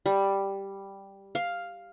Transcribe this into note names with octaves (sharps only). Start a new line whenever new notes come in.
G3
F5